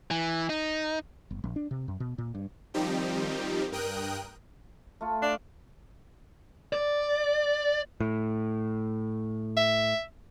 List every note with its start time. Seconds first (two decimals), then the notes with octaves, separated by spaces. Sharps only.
0.11 E3
0.49 D#4
1.31 G1
1.44 A#1
1.56 D4
1.71 C3
1.88 F#2
2.00 B2
2.18 A#2
2.35 G2
2.74 D#3 F3 G3 C4 D#4 G4
3.72 G2 A#4 G5 D#6 F#6
5.01 A3 F4
5.22 D4 F5
6.73 D5
8.00 A2
9.57 E5